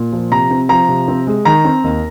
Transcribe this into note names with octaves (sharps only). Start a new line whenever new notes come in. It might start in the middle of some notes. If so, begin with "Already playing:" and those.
Already playing: A#2
F3
C3 A#5
C4
F3 A#5
C3
C4
G#3
D#3 A#5
C4
D#2